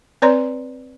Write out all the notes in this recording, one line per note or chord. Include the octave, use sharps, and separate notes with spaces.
C4 B4 C#5 D5 A#5 C6